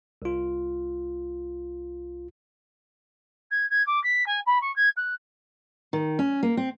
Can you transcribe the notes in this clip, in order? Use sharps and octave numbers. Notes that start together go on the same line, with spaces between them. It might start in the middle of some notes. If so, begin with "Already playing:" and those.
C2 F4
G#6
G#6
D6
B6
G#5
B5
C#6
G#6
F#6
D#3
C#4
A#3
C4